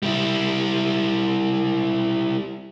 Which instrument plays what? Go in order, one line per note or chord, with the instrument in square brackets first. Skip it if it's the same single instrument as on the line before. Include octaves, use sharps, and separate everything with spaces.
[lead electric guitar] G3 E4